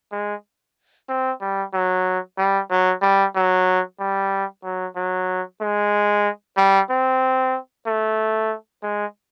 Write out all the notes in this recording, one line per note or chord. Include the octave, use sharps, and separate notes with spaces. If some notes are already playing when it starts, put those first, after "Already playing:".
G#3
C4
G3
F#3
G3
F#3
G3
F#3
G3
F#3
F#3
G#3
G3
C4
A3
G#3